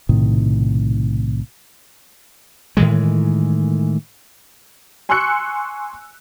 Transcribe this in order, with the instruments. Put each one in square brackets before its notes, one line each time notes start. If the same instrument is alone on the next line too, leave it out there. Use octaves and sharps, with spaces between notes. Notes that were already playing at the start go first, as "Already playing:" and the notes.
[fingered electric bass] B1 A2 C3 D#3
[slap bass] A2 D#3 E3 G#3
[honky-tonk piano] G#5 C6 C#6 E6 F#6 C#7